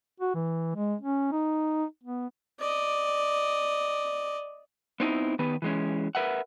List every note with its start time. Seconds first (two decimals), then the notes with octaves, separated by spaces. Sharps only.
0.20 F#4
0.35 E3
0.75 G#3
1.01 C#4
1.32 D#4
2.03 B3
2.59 D5 D#5
5.00 B3 C4 D#4 E4
5.39 D#3 B3 B4
5.62 E3 G#3 C#4
6.15 A#4 B4 E5 F#5